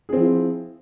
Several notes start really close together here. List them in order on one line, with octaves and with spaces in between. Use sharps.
G#4 C4 F3 E4 F4